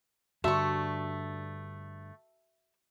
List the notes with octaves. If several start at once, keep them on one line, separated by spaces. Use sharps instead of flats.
G2 D3 A3 F#4 E5 C#6